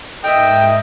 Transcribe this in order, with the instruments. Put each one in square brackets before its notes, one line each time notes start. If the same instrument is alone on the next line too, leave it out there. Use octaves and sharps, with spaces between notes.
[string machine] G#2 [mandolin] A#4 E5 [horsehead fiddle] D#5 [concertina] G5